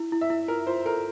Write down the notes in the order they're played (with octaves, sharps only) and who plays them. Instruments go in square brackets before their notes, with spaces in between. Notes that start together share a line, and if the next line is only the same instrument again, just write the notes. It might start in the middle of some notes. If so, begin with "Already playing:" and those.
Already playing: [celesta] E4
E4
[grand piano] E5
[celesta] E4
[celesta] F4 [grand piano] A#4
[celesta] F4 [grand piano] C5
[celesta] A4 [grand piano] A#4